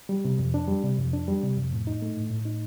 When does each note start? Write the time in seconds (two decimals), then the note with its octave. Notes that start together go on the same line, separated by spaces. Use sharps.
0.09 G3
0.25 C3
0.39 F2
0.54 D4
0.68 G3
0.83 C3
0.98 F2
1.13 D4
1.28 G3
1.43 C3
1.57 F2
1.72 A2
1.87 D#4
2.02 A3
2.17 A2
2.30 A2
2.45 D#4